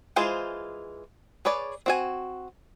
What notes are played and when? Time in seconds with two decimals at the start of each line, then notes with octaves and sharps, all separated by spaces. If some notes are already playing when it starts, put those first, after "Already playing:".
0.16 E3 G#3 F4 G#4 C5
1.45 G#4 B4 C#5 D5
1.86 C4 F#4 G#5